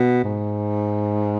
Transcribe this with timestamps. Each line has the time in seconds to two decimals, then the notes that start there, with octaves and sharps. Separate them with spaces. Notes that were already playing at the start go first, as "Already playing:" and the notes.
Already playing: B2
0.24 G#2